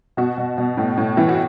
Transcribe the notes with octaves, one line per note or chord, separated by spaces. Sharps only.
B2 F#4
B2
B2
A2
A2
E3
F#4